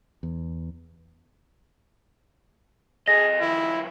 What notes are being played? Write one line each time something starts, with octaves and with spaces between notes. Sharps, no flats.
E2
G#4 A4 D#5 A#6
D#3 F3 E4